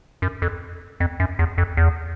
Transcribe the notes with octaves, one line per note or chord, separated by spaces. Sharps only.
F#2
F2
F2
F#2
E2
F2
E2